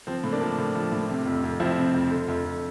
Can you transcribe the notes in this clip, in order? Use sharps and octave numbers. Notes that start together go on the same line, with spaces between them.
F3 C4
A2
A#3 D4
F3
A2
F3
A2
C3
F2
F2
F3 C4 E4
C3
F2
D3
F2
F2